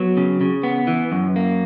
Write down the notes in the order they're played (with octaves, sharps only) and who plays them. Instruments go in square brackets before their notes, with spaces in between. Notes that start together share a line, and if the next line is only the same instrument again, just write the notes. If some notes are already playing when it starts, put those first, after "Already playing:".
Already playing: [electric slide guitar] F#3 B3
C#3
C#3
B3
E3
F#2
A#3